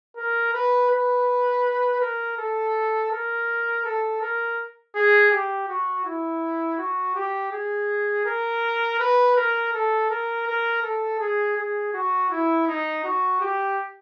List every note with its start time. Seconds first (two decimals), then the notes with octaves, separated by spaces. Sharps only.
0.16 A#4
0.53 B4
0.90 B4
2.01 A#4
2.38 A4
3.11 A#4
3.85 A4
4.21 A#4
4.95 G#4
5.31 G4
5.68 F#4
6.05 E4
6.78 F#4
7.15 G4
7.52 G#4
8.26 A#4
8.99 B4
9.36 A#4
9.73 A4
10.10 A#4
10.47 A#4
10.83 A4
11.19 G#4
11.57 G#4
11.93 F#4
12.30 E4
12.67 D#4
13.04 F#4
13.40 G4